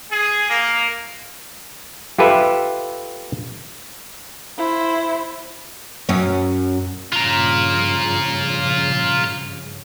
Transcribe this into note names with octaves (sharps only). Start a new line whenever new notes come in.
G#4
A#3
F4 G4 A4 B4 E5
E4 C5
F#2 C#4
G2 C#3 F3 F4 A#5